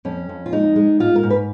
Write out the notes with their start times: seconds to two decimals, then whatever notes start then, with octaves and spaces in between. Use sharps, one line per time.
0.05 F2 C#4
0.29 F2
0.46 F4
0.53 G#3 D#4
0.76 G#3
1.00 G#2 F4
1.16 A#4
1.23 G#2
1.30 B4